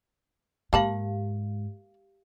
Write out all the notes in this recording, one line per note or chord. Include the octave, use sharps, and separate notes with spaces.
G#2 A#3 G4 F5 A5 B5